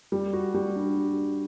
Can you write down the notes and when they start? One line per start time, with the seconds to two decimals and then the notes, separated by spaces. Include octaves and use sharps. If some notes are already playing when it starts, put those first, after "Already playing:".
0.12 G3
0.33 F#4
0.54 G3
0.76 D4